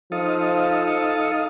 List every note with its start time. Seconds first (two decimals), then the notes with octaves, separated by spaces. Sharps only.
0.12 F3 D#4 A4 F5 D#6